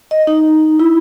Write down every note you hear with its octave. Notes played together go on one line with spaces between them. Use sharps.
D#5
D#4
E4